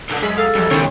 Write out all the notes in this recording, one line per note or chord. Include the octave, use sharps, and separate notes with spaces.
B1 D3 A#3 D4
F#2 G#3 G#4 B6
A4 F5
F2 F3 G3 G#3
C#2 B2 D3 D#3 C#4 G4 C5 C#5